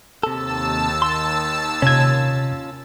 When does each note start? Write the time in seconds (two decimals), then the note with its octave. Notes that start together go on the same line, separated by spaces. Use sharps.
0.23 D#2 C3 A4 A5 E6
1.02 C6
1.82 C3 C#4 F4 G#6